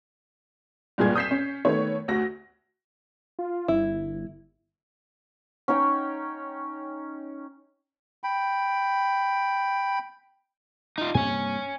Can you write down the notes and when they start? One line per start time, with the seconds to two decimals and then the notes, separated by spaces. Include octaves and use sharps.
0.98 C#2 G2 A#2 G#4 G#6
1.15 D#6 G6 B6 C7 E7
1.31 C#4
1.65 D#3 A3 B3 C#5
2.08 D2 F#4 A#6
3.39 F4
3.68 G1 E4
5.68 C#4 D#4 C#5 G5
8.24 G5 B5
10.98 D#4 F4
11.15 G2 C3 A#3 C#5 G#5